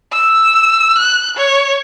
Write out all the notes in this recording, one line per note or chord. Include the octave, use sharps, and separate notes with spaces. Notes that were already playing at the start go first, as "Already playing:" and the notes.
E6
F#6
C#5